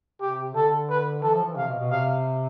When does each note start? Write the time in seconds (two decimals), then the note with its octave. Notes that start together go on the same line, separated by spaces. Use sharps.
0.21 C3 G4
0.55 D3 A4
0.89 B4
1.23 E3 A4
1.34 F3
1.45 E3
1.57 C3 F5
1.68 B2
1.80 B2
1.90 C3 F5